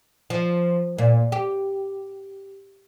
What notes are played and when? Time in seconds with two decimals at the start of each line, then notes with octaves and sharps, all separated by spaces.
0.30 F3
0.98 A#2
1.32 G4